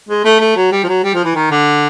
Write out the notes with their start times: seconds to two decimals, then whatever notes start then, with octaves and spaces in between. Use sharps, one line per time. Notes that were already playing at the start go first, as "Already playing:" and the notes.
0.09 G#3
0.25 A3
0.40 A3
0.56 F#3
0.72 G3
0.84 F3
0.88 F#3
1.04 G3
1.14 F3
1.24 E3
1.35 D#3
1.51 D3